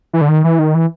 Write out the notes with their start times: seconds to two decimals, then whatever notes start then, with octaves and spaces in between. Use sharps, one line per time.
0.13 E3
0.21 D3
0.29 D#3
0.44 E3
0.59 D#3
0.75 E3